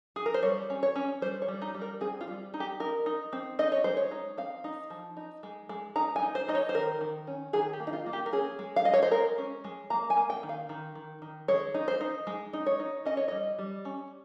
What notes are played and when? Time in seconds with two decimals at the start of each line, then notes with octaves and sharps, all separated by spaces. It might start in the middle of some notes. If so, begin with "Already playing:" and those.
0.16 G#4
0.26 A#4
0.34 C5
0.43 G3 C#5
0.70 C#4
0.83 C#5
0.96 C#4
1.22 G3 C5
1.42 C#5
1.48 G3
1.62 D#4
1.74 G3
1.81 A#4
2.01 C4 G#4
2.21 F4
2.28 G3
2.54 D#4
2.60 G4
2.80 D#4 A#4
3.06 D#4
3.33 C4
3.59 D#4 D#5
3.72 C#5
3.84 G#3 C5
3.97 C#5
4.11 D#4
4.38 C4 F5
4.64 D#4
4.90 F3
5.17 D#4
5.43 G#3
5.69 G#3
5.96 D#4 A#5
6.16 G#5
6.22 D#4
6.35 C5
6.48 D#4 D#5
6.55 C#5
6.69 C5
6.74 D#3 A#4
7.01 D#3
7.27 C#4
7.53 D#3 G#4
7.73 G4
7.80 A#3
7.87 D#4
7.93 F4
8.06 A#3
8.13 G4
8.26 A#4
8.32 C#4 G#4
8.59 G#3
8.76 F5
8.85 G#3 D#5
8.94 C#5
9.03 C5
9.11 G#3 A#4
9.38 C#4
9.64 G#3
9.90 A#3 A#5
10.10 G#5
10.17 A#3
10.30 G5
10.43 D#3
10.49 F5
10.69 D#3
10.95 D#3
11.22 D#3
11.48 G#3 C#5
11.74 D#4
11.88 C5
12.01 D#4
12.27 G#3
12.53 D#4
12.67 C#5
12.80 D#4
13.06 C#4 D#5
13.17 C#5
13.28 G3 D#5
13.59 G3
13.85 C#4